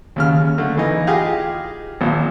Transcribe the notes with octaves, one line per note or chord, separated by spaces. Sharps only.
D#2 C#3 F6
D3 A3
E3 D#4
F4 G4 G#4 D#5 F5
G#1 A#2